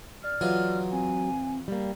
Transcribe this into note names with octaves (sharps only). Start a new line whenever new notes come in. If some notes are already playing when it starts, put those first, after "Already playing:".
D5 F6
E3 F#3 F4 G#4
C4 G#5
G3 A#3